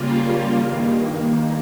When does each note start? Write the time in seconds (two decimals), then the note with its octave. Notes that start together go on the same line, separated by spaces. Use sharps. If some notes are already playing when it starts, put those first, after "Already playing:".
Already playing: C#3 G3 A#3 F4
0.53 G2 D#3 A#3